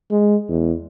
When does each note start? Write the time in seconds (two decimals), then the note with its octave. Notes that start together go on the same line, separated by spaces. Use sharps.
0.11 G#3
0.48 E2